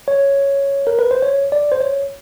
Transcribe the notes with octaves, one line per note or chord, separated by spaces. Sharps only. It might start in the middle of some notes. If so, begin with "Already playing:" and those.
C#5
A#4
B4
C5
C#5
D5
C5
C#5